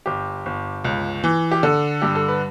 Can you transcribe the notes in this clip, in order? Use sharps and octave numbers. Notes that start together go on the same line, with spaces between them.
G1 G4
G1
C#2
E3
G4
D3 A4
G2 G4
A4
B4